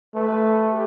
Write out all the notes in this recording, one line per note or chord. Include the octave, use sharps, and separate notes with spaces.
A3 B4
A4
G4